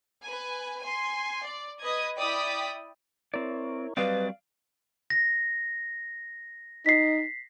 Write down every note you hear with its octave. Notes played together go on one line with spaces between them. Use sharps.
B4 G#5
G#5 C6
D5
B4 D#5 D#6 G#6
E4 D5 G5 D#6 B6
C4 E4 A#4 C#5 D5
F#3 G3 C4 B4 D5 D#5 F5 A6
A#6
D#4 B6 C7